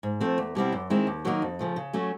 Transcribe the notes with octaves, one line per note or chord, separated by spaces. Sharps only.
G#2
F3 A3 C4
E2
B2 G3 C4 E4
F#2
D#3 G#3 C4 E4
D#2
D#3 F#3 A#3 D#4
F2
C#3 F3 A3
C#3
F#3 A3 C#4